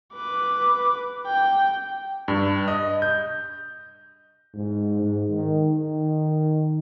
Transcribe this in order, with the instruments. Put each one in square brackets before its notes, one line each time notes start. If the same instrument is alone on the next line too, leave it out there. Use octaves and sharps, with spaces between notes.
[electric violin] B4 D6
G5
[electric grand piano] G2
D#5
G6
[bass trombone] G#2
G#2
D#3
D#3